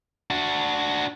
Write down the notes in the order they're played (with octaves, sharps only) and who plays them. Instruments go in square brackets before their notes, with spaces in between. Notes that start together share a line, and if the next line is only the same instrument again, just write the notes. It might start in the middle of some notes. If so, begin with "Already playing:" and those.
[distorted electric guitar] D4 F#4